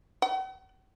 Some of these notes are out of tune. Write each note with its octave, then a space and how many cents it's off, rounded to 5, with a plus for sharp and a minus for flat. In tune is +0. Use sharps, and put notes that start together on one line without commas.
F#5 +45